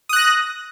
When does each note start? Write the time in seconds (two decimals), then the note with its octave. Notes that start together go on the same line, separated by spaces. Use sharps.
0.09 D#6
0.13 F#6
0.16 A#6